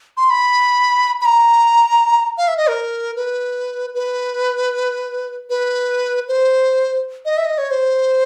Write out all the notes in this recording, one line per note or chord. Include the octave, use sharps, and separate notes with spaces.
C6
B5
B5
A#5
F5
E5
D#5
A#4
B4
B4
B4
C5
D#5
E5
D#5
C#5
C5